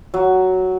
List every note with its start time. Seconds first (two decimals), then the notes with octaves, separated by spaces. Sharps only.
0.14 F#3